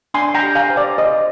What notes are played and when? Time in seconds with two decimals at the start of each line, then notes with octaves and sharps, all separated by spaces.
0.14 D4 G#5 C6
0.35 G5 A#5
0.43 G4
0.55 F5 G#5
0.70 C5
0.77 D5
0.98 C5 D#5